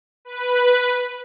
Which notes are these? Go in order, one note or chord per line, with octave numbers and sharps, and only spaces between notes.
B4